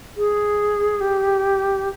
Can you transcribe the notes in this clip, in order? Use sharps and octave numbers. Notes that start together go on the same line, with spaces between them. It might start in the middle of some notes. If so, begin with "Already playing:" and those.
G#4
G4